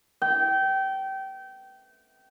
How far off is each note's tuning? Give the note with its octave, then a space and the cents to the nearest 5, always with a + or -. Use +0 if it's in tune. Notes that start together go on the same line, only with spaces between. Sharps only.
G5 -25